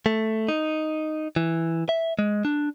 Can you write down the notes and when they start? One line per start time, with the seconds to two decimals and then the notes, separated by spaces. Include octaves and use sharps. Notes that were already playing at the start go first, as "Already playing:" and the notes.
0.06 A3
0.49 D#4
1.36 E3
1.89 E5
2.19 G#3
2.45 D4